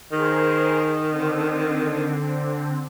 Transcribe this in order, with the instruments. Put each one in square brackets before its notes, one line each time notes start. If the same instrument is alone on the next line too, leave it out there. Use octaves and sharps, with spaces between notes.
[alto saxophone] D#3 [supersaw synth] G#4 A#4 C5
[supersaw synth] D3 C4